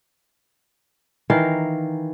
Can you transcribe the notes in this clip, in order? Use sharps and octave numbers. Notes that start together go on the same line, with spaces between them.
D#3 E3 A#4 F5